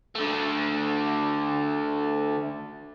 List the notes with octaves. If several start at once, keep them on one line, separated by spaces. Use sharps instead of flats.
D3 A3